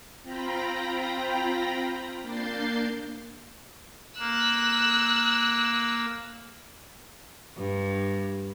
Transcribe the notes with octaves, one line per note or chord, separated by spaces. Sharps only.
C4 F4 G5 A#5 B5 A#6
A#3 D4 G6 A6 C7
A#3 E6 F#6
G2